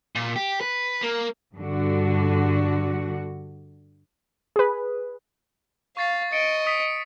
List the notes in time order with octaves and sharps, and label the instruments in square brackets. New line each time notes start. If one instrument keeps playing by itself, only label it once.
[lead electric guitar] A#2
G4
B4
A#3
[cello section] G2 D3 F#4
[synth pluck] G#4 B4
[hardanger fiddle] F5 [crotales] C#6 A6 C7
[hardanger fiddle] D#5 [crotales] A6 C#7 D7
[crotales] D#6 B6